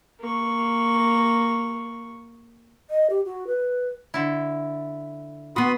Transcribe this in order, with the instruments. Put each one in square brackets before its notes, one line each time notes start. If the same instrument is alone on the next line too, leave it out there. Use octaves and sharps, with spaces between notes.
[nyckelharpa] A#3 C#6
[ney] D#5
G4
F#4
B4
[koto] D3 E4
[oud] B3 F#4 [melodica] B5 C6 D#6